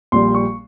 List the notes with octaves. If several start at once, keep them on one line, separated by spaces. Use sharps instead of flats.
A#1 A#2 G3 C6
C#6